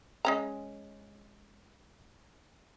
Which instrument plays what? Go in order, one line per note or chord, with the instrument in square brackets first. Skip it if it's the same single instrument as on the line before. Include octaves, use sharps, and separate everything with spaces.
[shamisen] G#3 C#4 A#5